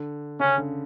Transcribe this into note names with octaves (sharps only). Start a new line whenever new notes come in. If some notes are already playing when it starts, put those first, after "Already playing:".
Already playing: D3
C#3 C#4
D3